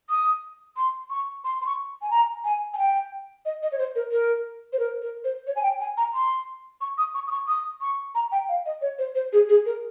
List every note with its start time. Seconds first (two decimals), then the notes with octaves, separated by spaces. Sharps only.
0.10 D#6
0.77 C6
1.10 C#6
1.44 C6
1.61 C6
1.66 C#6
2.02 G#5
2.10 A#5
2.44 G#5
2.74 G#5
2.78 G5
3.45 D#5
3.62 D#5
3.72 C#5
3.78 C5
3.95 A#4
4.12 A#4
4.73 C5
4.79 A#4
5.02 A#4
5.24 C5
5.47 C#5
5.56 G#5
5.63 G5
5.80 G#5
5.97 A#5
6.14 C6
6.81 C#6
6.98 D#6
7.14 C#6
7.27 D#6
7.31 C#6
7.48 D#6
7.81 C#6
8.15 A#5
8.32 G5
8.49 F5
8.66 D#5
8.82 C#5
8.99 C5
9.15 C5
9.33 G#4
9.49 G#4
9.66 A#4